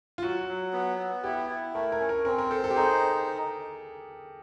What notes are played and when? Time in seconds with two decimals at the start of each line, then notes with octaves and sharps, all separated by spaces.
0.18 F4
0.23 F#3 F#4
0.49 F#3
0.73 B3
0.98 B3
1.24 E4 G4
1.50 E4
1.75 A3 A#4
1.92 A#4
2.00 C#4
2.09 A#4
2.25 C4 A#4
2.38 A#4
2.51 A4 C5
2.64 A4
2.70 G4
2.76 D#4 G#4